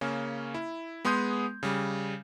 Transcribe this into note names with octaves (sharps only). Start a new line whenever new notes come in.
C#3 A#3 C#4
E4
G#3 B3 G#4 C6 D#6 G6
C#3 G3